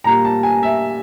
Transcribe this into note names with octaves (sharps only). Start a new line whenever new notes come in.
A#2 G3 A#3 A#5
A5
G#5
E5